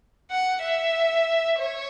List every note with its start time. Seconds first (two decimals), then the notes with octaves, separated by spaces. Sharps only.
0.31 F#5
0.64 E5
1.59 C#5